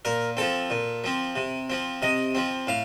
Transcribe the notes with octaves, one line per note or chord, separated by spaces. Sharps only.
A#2 A#4
F3 C4 A4
A#2
F3 C4
C3
F3 C4
C3 D#5
F3 C4
A2 F5